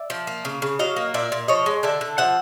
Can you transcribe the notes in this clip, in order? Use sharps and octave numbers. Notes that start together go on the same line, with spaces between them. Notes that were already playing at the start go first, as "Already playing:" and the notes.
Already playing: D5 E5
F3
A#3
C#3
C#3
F#3 D#5 F5
A#3
A#2 D5 E5
A#2
F3 C#5 D#5
G#3
D3 D5 E5
D3
F3 E5 F#5